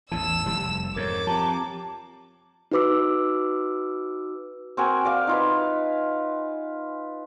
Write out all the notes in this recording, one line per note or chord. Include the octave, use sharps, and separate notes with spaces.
A1 E2 E3 A5 E6 E7
F1 G3
F2 G#2 A#4 C#5 D6
F3 C4 G4 A5 A#5
D#4 F#4 B4 D6 E6
C4 F#4 A#4 G#5
D5 F5
D#4 F4 B4